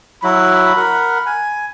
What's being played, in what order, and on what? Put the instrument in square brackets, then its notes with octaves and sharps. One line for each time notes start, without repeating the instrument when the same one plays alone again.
[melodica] F#3 E4 F#4 [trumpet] B5
[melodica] A#4 F#5
G#5